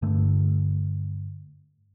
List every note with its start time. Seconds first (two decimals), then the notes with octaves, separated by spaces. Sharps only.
0.02 G2 D3 A3